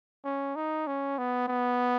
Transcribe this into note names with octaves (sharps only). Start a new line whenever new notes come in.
C#4
D#4
C#4
B3
B3